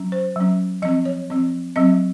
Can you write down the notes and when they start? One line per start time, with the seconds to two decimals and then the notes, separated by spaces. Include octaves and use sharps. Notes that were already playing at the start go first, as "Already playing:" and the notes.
Already playing: F#3 C#4
0.12 C5
0.36 F#3 C#4
0.82 F3 C4 D#5
1.05 C#5
1.30 F3 C4
1.76 F#3 C4 D#5